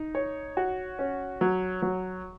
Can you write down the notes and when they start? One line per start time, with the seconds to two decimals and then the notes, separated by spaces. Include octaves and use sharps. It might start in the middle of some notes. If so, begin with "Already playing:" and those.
Already playing: D#4
0.15 C#5
0.57 F#4
0.99 C#4
1.41 F#3
1.82 F#3